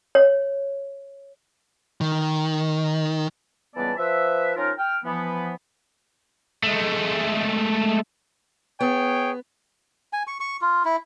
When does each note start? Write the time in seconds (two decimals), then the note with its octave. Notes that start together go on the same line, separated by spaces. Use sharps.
0.15 C#5
2.01 D#3
3.75 C#2 E3 G3 B3 D5 A5
3.97 F3 B4 E5
4.55 F3 C#4 D#4 F4 A#4
4.78 G5 F6
5.04 E3 F3 B3
6.63 G#3 A3
8.80 B3 G#4 C#5 G5
10.13 G#5
10.27 C#6
10.40 C#6
10.61 F4
10.85 E4